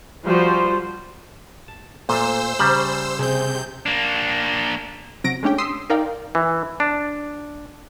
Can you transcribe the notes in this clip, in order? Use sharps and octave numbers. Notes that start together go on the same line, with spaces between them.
F3 G3 F4 F#4 C5
A5
A#2 A3 C5 E6
C#3 G3 A#5 F#7
C3 C4 G#4 G6
A#3 D4
C3 F#3 A#6 D7
G#3 A3 C#4 D4 G4 G5
C6 D#6 E6 B6 C7
D#4 A#4 D5 F5 G5
E3
D4